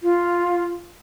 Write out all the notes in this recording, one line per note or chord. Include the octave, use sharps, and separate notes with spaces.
F4